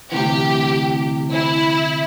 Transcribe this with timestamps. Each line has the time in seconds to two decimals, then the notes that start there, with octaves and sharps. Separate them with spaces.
0.11 D2 C3 E3 G4
1.32 E4